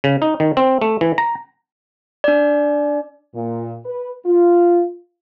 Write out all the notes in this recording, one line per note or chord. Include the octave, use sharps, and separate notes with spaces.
C#3
D#4
D#3
C4
A3
E3
A#5
D4 D5
A#2
B4
F4